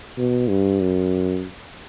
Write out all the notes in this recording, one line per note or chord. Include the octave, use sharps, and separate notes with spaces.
B2
G2
F#2